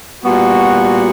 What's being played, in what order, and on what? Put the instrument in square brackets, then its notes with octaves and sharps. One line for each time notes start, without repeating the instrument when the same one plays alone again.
[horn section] A#2 G3 B3 F#4